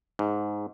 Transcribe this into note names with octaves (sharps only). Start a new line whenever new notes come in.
G#2